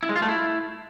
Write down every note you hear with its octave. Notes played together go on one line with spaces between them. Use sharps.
E4
G#3
F4
A3
E4